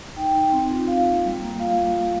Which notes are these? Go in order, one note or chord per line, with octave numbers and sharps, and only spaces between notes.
D#4 G5
D#4
C4
F4
D#4 F5
A#3
G3
A#3
F4 F5